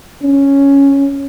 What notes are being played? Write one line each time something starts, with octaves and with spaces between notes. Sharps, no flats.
C#4